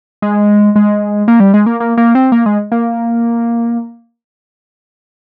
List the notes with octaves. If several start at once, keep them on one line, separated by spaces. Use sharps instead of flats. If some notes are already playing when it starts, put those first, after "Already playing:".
G#3
G#3
A#3
G3
G#3
A#3
A#3
A#3
C4
A#3
G#3
A#3